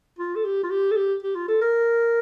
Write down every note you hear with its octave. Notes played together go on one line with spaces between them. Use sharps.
F4
A4
G4
F4
G4
A4
G4
G4
F4
A4
A#4